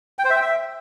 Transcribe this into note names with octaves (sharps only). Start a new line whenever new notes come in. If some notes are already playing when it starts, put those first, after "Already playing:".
G5
C5
E5
G5
E5